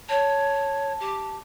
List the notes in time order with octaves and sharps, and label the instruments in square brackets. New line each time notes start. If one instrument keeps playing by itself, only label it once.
[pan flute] C#5 [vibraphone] A5
[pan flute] G4